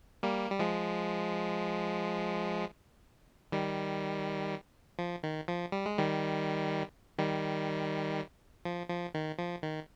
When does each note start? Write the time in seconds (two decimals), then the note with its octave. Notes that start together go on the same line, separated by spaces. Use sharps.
0.23 G3 A#3
0.50 G3
0.60 F3 G#3
3.52 D#3 G3
4.99 F3
5.23 D#3
5.48 F3
5.72 G3
5.86 G#3
5.98 D#3 G3
7.18 D#3 G3
8.65 F3
8.90 F3
9.14 D#3
9.39 F3
9.63 D#3